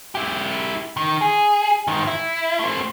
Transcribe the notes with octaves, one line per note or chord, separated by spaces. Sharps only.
E4 G4
D#3
G#4
G#2 D#3
E4
A3 C4